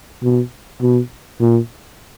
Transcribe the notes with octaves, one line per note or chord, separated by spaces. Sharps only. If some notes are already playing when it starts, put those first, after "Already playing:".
B2
B2
A#2